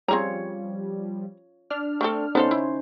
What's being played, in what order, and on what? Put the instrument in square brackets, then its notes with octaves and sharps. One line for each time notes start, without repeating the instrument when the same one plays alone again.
[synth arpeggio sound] F3 G3 [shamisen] C4 G#4 A#5 [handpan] F4 C#5
[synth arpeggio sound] D4 F6
[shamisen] A3 C4 A4
[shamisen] B3 A4 F5 [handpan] C#4 D#4 C5
[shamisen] E4